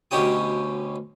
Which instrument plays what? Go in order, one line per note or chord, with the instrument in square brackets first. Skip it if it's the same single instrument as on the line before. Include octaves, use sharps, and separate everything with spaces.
[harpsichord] D2 B2 C#4 G4 D#6